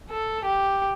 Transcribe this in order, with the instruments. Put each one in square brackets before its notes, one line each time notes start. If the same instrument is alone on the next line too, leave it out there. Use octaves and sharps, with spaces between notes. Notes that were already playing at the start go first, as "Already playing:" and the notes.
[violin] A4
G4